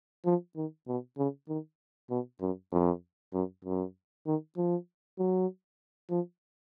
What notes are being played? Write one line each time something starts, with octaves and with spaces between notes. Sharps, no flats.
F3
D#3
B2
C#3
D#3
B2
F#2
F2
F#2
F#2
D#3
F3
F#3
F3